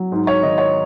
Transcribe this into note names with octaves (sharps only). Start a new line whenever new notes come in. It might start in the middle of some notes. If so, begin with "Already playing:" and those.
Already playing: F#3
G#2
C#5
D#3 D#5
C#5